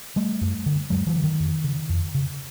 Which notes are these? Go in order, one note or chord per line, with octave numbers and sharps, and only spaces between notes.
G3 A3
F#2
D3
F#2 F#3 G#3
E3 F#3
D3
D#3
F2
C#3
F2
C#3